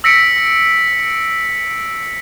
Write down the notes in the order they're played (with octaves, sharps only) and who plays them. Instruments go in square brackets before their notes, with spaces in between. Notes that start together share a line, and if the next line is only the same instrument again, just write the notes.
[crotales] E6 A#6 B6 C#7 D7